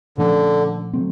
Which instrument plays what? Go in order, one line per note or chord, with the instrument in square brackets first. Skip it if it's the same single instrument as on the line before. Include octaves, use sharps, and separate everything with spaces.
[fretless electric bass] A#2 F3 A3 C#4 [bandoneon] D3
[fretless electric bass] D3 F#3 A3 C4